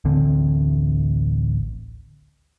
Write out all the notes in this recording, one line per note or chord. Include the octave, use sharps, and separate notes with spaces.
D1 A1 D3 C4